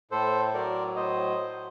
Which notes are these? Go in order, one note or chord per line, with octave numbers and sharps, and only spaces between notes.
A2 A4 C5
F#3 A#4 D5
A2 C5 D#5
F#3